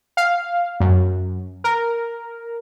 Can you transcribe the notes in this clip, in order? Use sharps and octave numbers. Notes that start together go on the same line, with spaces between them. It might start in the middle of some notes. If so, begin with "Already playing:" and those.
F5
F#2
A#4